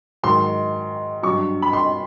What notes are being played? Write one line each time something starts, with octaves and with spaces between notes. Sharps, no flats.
G#2 D#3 F#3 C6
G2 D3 F#3 C#6
B5
C6